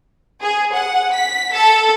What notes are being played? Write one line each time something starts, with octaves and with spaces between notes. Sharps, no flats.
G#4
F#5
B6
A4